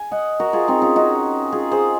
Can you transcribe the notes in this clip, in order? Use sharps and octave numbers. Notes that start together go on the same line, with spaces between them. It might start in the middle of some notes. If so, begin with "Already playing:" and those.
Already playing: G#5
D#5 F#5
F#4 A#4
F4 G#4
C4 D#4
C#4 F4
D#4 F#4
F4 G#4
G#4 C5